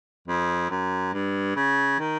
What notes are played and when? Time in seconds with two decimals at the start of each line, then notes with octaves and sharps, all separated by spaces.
0.28 F2
0.70 F#2
1.13 G2
1.56 C#3
1.99 D#3